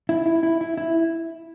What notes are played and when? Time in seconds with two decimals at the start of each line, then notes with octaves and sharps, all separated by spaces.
0.09 E4
0.26 E4
0.43 E4
0.61 E4
0.78 E4